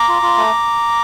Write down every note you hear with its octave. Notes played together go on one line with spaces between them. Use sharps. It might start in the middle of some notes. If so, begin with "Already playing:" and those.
Already playing: A#5 D6
F4
F4
A3